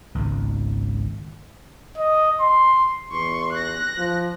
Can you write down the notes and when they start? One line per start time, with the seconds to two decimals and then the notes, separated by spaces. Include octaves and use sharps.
0.15 G#1 C#2
1.98 D#5
2.41 C6
3.12 E2 C6 C#6
3.52 F#6 A#6
3.98 F3